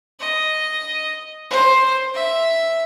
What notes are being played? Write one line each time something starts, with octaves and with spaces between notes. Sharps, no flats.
D#5
C5
E5